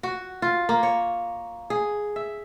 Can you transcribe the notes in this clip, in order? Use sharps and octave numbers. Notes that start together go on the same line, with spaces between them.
F#4
F4
A#3
C#5
G#4
E5